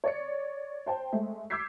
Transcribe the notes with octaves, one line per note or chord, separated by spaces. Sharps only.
C#5 D5 C#7
C5 G5 A5
G#3 A3
D6 E6 G6 G#6 B6 C7